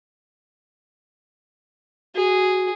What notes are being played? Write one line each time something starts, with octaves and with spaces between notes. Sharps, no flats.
F#4 G#4